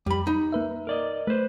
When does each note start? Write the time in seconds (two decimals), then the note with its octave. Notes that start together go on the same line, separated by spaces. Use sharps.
0.06 F2 G3 B5
0.27 D#4
0.52 A#3 B4 E5
0.87 A#4 D5 D#5
1.27 A3 B4 C5